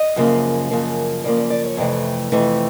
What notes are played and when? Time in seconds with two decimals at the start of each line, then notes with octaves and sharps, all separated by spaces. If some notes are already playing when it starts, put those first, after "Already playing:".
Already playing: D#5
0.16 F#2 C#3 F3 A#3
0.71 F#2 C#3 F3 A#3
1.24 F#2 C#3 F3 A#3 D5
1.38 D5
1.50 D5
1.65 C#5
1.77 F2 C3 E3 A3 D5
2.32 F2 C3 E3 A3